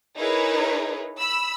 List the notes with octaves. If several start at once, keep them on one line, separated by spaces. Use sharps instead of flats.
D#4 E4 G#4 A#4 B4 C#5
B5 E6